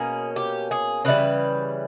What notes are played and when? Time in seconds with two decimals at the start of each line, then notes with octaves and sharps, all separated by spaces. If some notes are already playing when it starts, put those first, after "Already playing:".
Already playing: B2 A#3 C#4 G#4
0.36 G4
0.71 G#4
1.05 C#3 E3 G3 B4